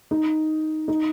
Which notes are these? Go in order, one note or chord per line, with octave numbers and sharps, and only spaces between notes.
D#4
D#4